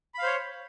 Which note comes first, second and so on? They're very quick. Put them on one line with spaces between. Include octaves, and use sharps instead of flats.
B5 F5 C5 C#5